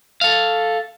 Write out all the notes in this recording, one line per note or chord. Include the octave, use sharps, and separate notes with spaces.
A4 F5